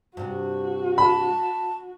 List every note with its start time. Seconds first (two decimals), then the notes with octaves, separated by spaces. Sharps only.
0.17 G2 C3 F#4
0.98 A5 B5